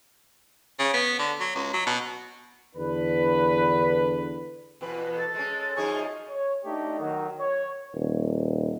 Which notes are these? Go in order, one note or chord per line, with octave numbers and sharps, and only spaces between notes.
C#3
B3
D3
F#3
C#2
F#3
B2
E2 D3 D4 B4
E2 B2 B4
A4
G#3 C#4
F#2 F3 D#4 G#4 C#6
C#5
A3 D4 D#4 G4
D#3 F#3
C#5
D#1